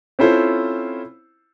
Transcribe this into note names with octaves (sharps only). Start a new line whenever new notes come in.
C4 C#4 E4 F4 A4 C5